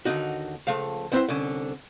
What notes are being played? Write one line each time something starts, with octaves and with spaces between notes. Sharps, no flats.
D#2 G#2 D3 D#4 F#4
C#2 F3 A3 F5
B3 C4 E4 B4 C5 F#5
C2 D3 C#4